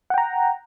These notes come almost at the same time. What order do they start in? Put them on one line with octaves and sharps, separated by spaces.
F#5 G5 A#5